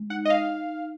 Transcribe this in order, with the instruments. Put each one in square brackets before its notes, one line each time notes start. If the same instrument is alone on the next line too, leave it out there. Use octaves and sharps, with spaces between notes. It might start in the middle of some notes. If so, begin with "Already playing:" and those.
Already playing: [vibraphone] G#3
[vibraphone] D#4 [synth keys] F#5
[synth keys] D#5
F5
[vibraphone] D#4